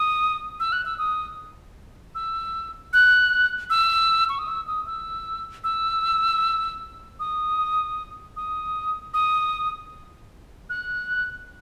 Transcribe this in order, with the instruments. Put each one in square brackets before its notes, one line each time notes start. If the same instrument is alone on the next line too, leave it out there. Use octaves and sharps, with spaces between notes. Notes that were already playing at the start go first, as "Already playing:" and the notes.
Already playing: [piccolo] D#6
E6
F#6
E6
D#6
E6
F#6
E6
C#6
D#6
E6
D#6
E6
E6
D#6
D#6
D#6
F#6